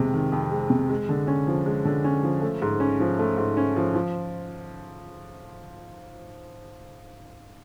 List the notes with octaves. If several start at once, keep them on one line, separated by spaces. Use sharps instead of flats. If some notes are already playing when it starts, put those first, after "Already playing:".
Already playing: F2 C3 D#3 G#3
D#3
F2
G#3
C3
G#3
D3
C#4
F3
G#3
D3
C#4
F3
A3
G#2
C#4
F3
A3
G#2
C#4
F3
F3